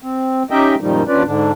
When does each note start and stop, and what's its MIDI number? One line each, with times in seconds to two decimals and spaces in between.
0.02 0.43 60
0.51 0.75 61
0.51 0.75 63
0.51 0.75 67
0.51 0.75 75
0.51 0.75 76
0.51 0.75 79
0.81 1.03 42
0.81 1.03 46
0.81 1.03 51
0.81 1.03 53
0.81 1.03 55
0.81 1.03 63
1.08 1.23 39
1.08 1.23 61
1.08 1.23 62
1.08 1.23 65
1.08 1.23 71
1.08 1.23 74
1.25 1.51 44
1.25 1.51 50
1.25 1.51 62